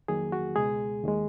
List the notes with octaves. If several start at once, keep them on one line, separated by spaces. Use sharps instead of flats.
F2 D#3 F#3 A#3 G#4
F#4
C#2 B2 G#3 G#4
D#2 D#3 G#3